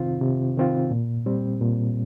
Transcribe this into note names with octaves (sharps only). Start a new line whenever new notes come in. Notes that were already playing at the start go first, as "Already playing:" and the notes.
Already playing: C3 D#3 C4 F4
C3
D#3 C4 F4
A#2
G3 C4
A#2